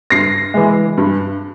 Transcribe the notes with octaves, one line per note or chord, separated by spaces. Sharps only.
G2 A#6 C7
E3 G#3
G2